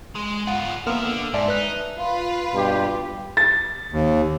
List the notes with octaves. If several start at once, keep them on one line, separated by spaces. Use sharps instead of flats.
G#3
B3 F4 F#5
F3 A#3 B3 E5 F6
D3
G#2 D5 E5 A5
D#4 B4 F#6
F4 B4
G2 B2 G4
A6
D#2